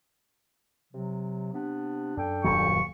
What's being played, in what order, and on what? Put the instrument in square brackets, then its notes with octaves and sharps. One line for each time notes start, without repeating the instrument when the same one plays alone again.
[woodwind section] C3 F#3
C3 B3 D4
[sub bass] F#2 [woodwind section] D4 A4 G5
[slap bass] D#1 A#2 F#3 [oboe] C#6